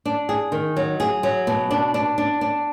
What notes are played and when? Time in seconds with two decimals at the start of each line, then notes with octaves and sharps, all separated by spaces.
0.05 D4
0.29 G#4
0.52 D#3
0.77 F#3
1.00 G#4
1.23 F#3
1.47 B2
1.71 D4
1.94 D4
2.18 D4
2.41 D4